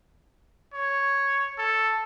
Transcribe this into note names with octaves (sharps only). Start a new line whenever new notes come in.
C#5
A4